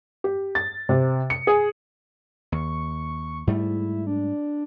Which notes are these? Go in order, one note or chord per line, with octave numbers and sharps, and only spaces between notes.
G4
A6
C3
C#7
G#4
D#2 C#6
G#2 G3 A3 E4
D4